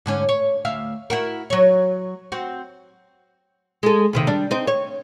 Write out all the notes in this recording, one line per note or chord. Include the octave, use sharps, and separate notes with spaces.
G#2 D3 C#4
C#5
D2 E5 F5
E4 F#4 A#4
F#3 C#5
C4 F#4
G#3 A4
D#2 C3 D#3
G3 D4
C4 D#4
C#5